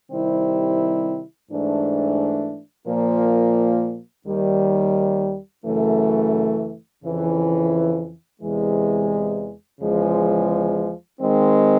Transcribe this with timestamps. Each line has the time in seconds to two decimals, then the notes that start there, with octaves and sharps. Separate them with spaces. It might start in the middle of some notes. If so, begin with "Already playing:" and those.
0.12 C3 D#3 G3 C4 E4
1.49 G#2 E3 A3 D4
2.88 A#2 F3 A#3
4.26 D#2 D#3 G3
5.65 F#2 C#3 E3 A3
7.03 F2 C#3 E3
8.42 E2 C3 E3 G#3
9.80 E2 C#3 F3 G#3
11.19 D#3 G#3 C4